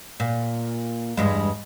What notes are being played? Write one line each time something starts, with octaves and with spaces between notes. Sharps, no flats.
A#2
E2 G2 G#3